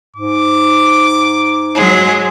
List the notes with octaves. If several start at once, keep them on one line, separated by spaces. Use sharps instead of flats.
G#2 D6
F#3 G#3